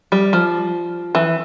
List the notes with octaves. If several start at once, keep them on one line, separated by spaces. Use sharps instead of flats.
G3
F3
E3